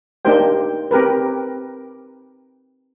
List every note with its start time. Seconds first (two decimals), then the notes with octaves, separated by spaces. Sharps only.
0.25 A#3 D4 D#4 G4 C5 G5
0.91 C4 G4 A#4 B4